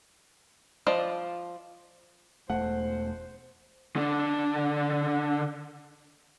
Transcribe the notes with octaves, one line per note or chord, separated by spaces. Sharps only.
F3 D5 D#5 A5
E1 A3 C5 F#5
D3 D4